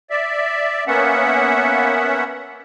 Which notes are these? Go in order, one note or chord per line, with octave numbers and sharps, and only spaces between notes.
D5 E5
A#3 B3 C#4 E5 F#5